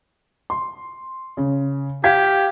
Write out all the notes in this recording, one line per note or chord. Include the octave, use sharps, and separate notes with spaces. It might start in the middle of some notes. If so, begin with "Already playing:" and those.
C6
C#3
G4 F5 G#6 B6